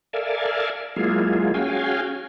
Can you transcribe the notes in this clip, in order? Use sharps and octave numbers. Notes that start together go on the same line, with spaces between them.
A4 A#4 D5 E5 F5 G#5
F#3 G#3 A#3 E4 F4 G#4
C#4 F#4 G#4 F5 G5 G#5